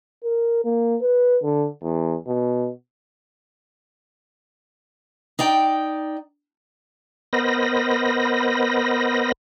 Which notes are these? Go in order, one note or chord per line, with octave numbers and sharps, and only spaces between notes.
A#4
A#3
B4
D3
E2
B2
D#4 D5 G5
B3 A#4 C5 D#5 B5 A#6